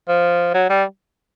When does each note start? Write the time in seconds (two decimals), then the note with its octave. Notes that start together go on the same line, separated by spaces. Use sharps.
0.08 F3
0.54 F#3
0.70 G3